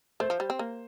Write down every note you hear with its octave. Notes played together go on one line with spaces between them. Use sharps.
A3 C5
F3
G3
C4
A#3